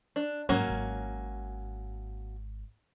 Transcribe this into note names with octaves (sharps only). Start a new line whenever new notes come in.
D4
G#1 F#3 A#3 C#4
G#1